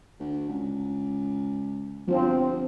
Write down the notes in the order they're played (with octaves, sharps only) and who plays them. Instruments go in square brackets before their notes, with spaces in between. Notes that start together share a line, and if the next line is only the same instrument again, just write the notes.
[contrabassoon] D2
C#2
[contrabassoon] G1 [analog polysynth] F3 C4